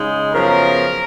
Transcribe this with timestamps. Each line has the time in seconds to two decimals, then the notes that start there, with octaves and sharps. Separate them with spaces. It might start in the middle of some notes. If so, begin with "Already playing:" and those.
Already playing: C#3 G#3 D#4
0.33 F#2 C#3 F3 B3 A#4